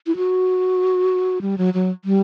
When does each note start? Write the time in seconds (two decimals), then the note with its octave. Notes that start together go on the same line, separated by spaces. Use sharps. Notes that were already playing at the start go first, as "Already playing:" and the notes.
0.07 E4
0.17 F#4
1.42 G3
1.58 F#3
1.74 F#3
2.05 G3